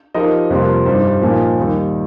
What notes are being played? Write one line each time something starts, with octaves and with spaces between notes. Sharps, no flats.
F3 D#4 G4 A#4 D#5
F2 C3 G3 A#3 F4
G2 G3 D#4 C5
A#2 F3 D#4
D#2 D#3 G3 D#4